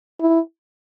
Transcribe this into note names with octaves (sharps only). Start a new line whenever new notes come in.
E4